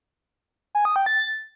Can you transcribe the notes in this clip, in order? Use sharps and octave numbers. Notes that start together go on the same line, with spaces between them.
G#5
D#6
G5
A6